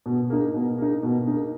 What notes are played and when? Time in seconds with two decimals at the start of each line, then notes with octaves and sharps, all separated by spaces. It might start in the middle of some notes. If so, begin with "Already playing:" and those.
0.06 B2
0.30 A#3 D#4
0.54 B2
0.78 A#3 D#4
1.03 B2
1.27 A#3 D#4